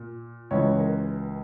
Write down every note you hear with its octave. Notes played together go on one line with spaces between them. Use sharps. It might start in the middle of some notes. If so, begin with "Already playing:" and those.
Already playing: A#2
C#2 C#3 E3 C#5
A#4